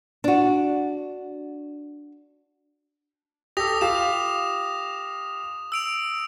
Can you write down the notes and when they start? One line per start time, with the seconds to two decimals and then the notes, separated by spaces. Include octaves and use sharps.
0.24 D4 F#4
3.57 G4 A4 D#6 A#6 F7
3.81 F4 G4 F5 E7
5.72 E6 D7 F7